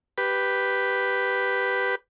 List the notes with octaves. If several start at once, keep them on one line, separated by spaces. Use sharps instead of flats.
G4 B4